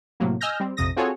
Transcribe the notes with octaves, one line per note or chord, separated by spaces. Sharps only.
A2 C3 F#3 A#3
D#5 G#5 E6 F6 G6 A#6
G3 C4
A#1 F2 C3 D#6 A#6
C4 F4 F#4 G#4 A4 C#5